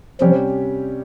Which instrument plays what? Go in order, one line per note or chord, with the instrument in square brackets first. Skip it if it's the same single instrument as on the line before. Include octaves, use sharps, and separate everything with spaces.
[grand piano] C3 G3 C#4 G4 [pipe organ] F3